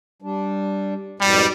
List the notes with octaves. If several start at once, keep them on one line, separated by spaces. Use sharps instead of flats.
G3 D4
F2 G#2 B2 G3